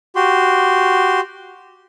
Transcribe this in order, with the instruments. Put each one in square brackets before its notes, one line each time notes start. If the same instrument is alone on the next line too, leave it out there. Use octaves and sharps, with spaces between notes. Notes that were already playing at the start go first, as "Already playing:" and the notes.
[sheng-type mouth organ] F#4 G4 C6